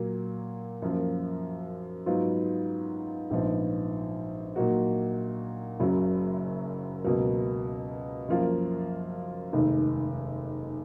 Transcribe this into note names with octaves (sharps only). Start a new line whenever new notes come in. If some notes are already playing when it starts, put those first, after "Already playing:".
Already playing: A#2 F#3 A#3
F#2 F3 A#3
G#2 F#3 B3 F4
A#1 G#2 F3 B3
A#2 F#3 A#3 D#4 F#4
F#1 F#2 C#3 F#3 C#4
C#2 B2 F#3 A#3
F#2 F3 A#3 F4
F1 D#2 D#3 G#3